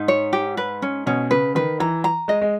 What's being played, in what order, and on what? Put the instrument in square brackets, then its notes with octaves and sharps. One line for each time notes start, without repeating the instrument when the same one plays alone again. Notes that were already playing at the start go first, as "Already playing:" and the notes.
Already playing: [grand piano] G#2 [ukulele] D#4
[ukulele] C#5
G4
B4
C#4
[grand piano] B2 [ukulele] C#4
[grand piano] C#3 [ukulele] B4
[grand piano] D#3 [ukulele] B4
[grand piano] E3 [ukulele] A#5
[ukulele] A#5
[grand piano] G#3 [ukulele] D#5
[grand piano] G#3